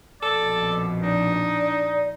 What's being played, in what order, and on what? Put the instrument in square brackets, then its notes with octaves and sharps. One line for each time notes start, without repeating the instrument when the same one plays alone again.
[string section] A#1 F2 B2 [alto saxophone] A4 [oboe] D5
[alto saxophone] D4 [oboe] D#4 [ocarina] D5